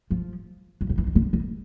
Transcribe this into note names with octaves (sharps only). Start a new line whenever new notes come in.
F3
F#3
F3
E3
D#3
D3
E3